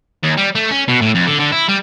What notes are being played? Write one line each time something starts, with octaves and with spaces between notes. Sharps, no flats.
D#2
G3
A3
C#4
B2
A2
F2
D3
D3
E4
G3